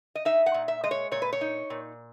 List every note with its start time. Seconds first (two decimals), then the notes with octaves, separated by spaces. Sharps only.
0.15 D#5
0.25 D#4 E5
0.46 F#5
0.54 A#2
0.68 E5
0.84 G#3 D#5
0.91 C#5
1.12 A#2 C#5
1.22 B4
1.33 C#5
1.41 D#4
1.70 A#2